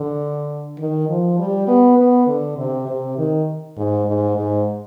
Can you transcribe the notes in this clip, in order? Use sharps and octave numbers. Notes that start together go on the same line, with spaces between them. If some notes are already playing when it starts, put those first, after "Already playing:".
Already playing: D3
D#3
F3
G3
B3
B3
D3
C3
C3
D#3
G#2
G#2
G#2